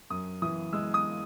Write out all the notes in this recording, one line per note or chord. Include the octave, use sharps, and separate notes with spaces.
F#2 D#6
E3 D#6
G#3 E6
D#6